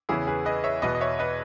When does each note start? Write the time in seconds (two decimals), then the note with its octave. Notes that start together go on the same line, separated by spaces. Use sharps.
0.09 E2 C#3 E3 E4 G#4
0.27 G#4 B4
0.45 B4 D#5
0.64 C#5 E5
0.82 E2 B2 B4 D#5
0.95 D#5
1.01 C#5 E5
1.19 B4 D#5